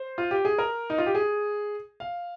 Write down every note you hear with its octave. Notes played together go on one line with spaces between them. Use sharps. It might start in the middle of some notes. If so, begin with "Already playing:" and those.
Already playing: C5
F4
G4
G#4
A#4
D#4
F4
G4
G#4
F5